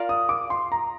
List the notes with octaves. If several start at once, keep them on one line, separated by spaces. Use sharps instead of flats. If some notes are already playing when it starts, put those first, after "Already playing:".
Already playing: F4 A#4 D5 F5
D#6
D6
C6
A#5